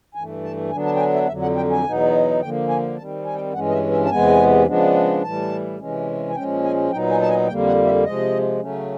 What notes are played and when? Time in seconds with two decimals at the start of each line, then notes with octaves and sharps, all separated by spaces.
0.15 G2 E3 A3 G#5
0.44 A5
0.71 D3 F#3 B3 D4 G#5
0.85 A5
0.96 G5
0.99 G#5
1.14 E5
1.27 F2 D3 F#3 E5
1.42 F#5
1.57 G5
1.71 G#5
1.84 E2 B2 F#3 B3 D#4
2.40 D3 F3 A#3 G5
2.69 G#5
2.97 D#3 G3 C4 A5
3.25 G#5
3.35 G5
3.53 G2 E3 G#3 C#4 F#5
3.68 D#5
3.73 E5
3.91 E5
4.05 A5
4.10 E2 C3 E3 G#3 B3 G#5
4.66 C#3 F3 G#3 B3 D4
5.23 A2 E3 G3 A5
5.79 C3 E3 G#3 C#4
6.30 G#5
6.35 A#2 F3 G#3 C#4 G5
6.64 G#5
6.92 A#2 F#3 B3 D#4 G5
7.10 G#5
7.22 A5
7.29 G#5
7.48 F2 D3 G3 A#3 G5
7.67 F#5
7.85 E5
8.04 C3 F3 G#3 D#5
8.60 C#3 F#3 A3 C#4